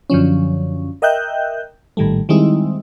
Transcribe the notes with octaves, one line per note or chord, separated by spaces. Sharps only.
F#2 D3 F3 C#4
A#4 D#5 E5 G5 F#6 G6
A#1 A2 D#3 G3 A3
D#3 G3 G#3 C4 D#4 E4